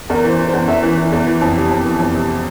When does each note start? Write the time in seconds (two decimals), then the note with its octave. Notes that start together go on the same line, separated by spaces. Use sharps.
0.10 E2 A#4
0.24 E3
0.29 C5
0.39 E3
0.48 C5
0.53 E2
0.68 E2 E5
0.83 E3
0.97 E3
1.12 E2
1.26 E3
1.41 F2
1.55 C3
1.70 F2
1.85 E3
2.00 F2
2.14 C3